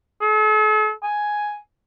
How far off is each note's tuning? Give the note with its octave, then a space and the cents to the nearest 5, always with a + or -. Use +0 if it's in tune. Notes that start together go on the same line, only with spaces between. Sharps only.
A4 -45
G#5 +5